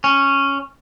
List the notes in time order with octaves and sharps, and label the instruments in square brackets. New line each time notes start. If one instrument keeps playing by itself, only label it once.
[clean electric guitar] C#4